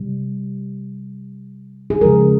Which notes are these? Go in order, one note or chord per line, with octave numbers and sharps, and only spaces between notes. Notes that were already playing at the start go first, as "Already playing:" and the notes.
Already playing: C3 G3
G#4
C#3 F3 G#3 A#4